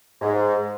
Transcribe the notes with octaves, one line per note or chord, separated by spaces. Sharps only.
G#2